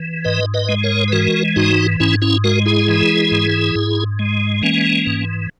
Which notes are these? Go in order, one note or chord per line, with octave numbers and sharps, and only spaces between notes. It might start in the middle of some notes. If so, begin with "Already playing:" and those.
Already playing: E3
G#2 B4 D#5
B4 D#5
G#3
A#4 C#5
B4
E3 F#4 A#4
G#2 D#4 F#4
G#2 C#4 E4
C#4 E4
G#3 F#4 A#4
E4 G#4
E3
G#2
G#2
G#3
E3 A#3 C#4
G#2